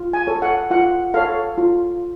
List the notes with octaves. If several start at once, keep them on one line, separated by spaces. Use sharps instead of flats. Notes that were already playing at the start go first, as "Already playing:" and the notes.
Already playing: F4
G#5
A4 C#5
F#5
F4 F#5
A4 C#5 F5
F4